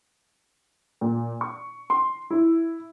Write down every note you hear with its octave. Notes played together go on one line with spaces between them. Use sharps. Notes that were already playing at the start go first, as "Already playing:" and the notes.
A#2
C#6
C6
E4